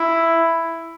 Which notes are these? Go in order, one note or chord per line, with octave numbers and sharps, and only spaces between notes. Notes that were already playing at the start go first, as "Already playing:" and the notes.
Already playing: E4